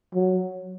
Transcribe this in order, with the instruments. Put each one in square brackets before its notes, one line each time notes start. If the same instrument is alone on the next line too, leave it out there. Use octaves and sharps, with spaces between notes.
[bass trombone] F#3